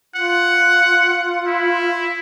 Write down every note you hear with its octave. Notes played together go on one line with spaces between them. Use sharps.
F4 F#5
E4